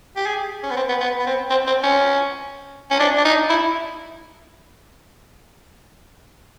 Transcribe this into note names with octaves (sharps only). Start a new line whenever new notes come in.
G4
G#4
C#4
B3
C4
B3
B3
B3
C4
C4
C4
C#4
C#4
D4
D4
D#4
E4